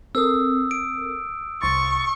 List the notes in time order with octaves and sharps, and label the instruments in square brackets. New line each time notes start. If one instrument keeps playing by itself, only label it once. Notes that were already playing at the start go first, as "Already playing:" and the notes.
[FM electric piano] C4 A4 A#4 [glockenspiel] D#6 E6
[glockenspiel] D7
[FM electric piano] C2 C6 A6 [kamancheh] C#6